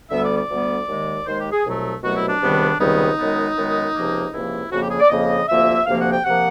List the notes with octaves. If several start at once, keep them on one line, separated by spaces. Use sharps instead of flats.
D2 D3 G3 B3 E5
D5
D5
D2 D3 G3 B3
D#2 D#3 G#3
D#2 D#3 G#3 C5
G4
G#4
C2 B2 F#3 A3
C2 B2 F#3 A3 F#4
E4
D4
C#2 C3 D#3 G3 B3
C#2 C3 D#3 G3 B3 D#4
F#2 D#3 G#3 B3
F#2 D#3 G#3 B3
C#2 C3 F3 A#3
C#2 C3 F3 A#3 E4
F2 C#3 F3 A#3 F#4
G4
G#4
D5
F2 C#3 F3 A#3 D#5
D2 C3 F3 A#3 E5
D2 C3 F3 A#3 F5
F#5
G5
C3 F3 A#3 F#5